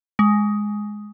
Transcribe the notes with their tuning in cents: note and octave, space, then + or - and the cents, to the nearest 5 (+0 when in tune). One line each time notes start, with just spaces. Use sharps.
G#3 +5